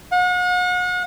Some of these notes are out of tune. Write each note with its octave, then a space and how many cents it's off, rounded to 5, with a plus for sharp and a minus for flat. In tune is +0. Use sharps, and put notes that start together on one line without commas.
F#5 -40